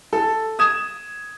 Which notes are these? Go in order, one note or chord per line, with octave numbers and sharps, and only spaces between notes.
A4
D#6 G#6 E7